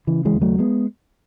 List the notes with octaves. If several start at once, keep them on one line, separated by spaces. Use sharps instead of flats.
C#3 E3
E3 G#3
D#2
F#3 A3
G#3 B3